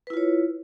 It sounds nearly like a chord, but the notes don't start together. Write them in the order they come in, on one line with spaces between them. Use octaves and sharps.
B4 E4 F4 C#5